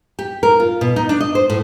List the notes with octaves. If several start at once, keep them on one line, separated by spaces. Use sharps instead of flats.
G4
A#4
F4
B2
D#4
D4
D#5
C5
A2